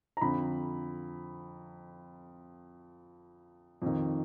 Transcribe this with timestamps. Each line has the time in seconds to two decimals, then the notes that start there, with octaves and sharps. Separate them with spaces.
0.17 A#5
0.21 F2 D3 B5
3.82 F2 D#3